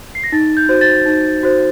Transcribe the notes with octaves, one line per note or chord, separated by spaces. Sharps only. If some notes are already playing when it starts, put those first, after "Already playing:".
C7
A#6
D#4 A6
G6
F#4 C5
A6
D#4
F#4 C5